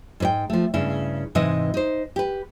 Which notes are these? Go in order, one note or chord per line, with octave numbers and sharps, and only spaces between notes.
G#2 B4 G5
F3 A3
G2 C#3 E4
G#2 C3 E3 E4 B4 D#5
D#4 C5
G4 B4